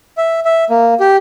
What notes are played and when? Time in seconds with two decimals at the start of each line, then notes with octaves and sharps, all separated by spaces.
0.17 E5
0.45 E5
0.70 A#3
1.00 G4